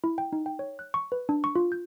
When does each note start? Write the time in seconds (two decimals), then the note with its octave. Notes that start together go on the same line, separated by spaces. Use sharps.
0.04 E4
0.18 G5
0.33 D#4
0.46 G5
0.59 C#5
0.79 F#6
0.94 C#6
1.12 B4
1.29 D4
1.44 C#6
1.56 F4
1.72 G6